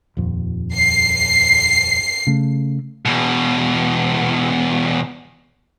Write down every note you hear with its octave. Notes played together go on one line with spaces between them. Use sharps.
D#1 F2
C7
C#3 A3
E2 B2